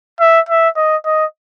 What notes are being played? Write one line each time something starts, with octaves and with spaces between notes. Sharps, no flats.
E5
E5
D#5
D#5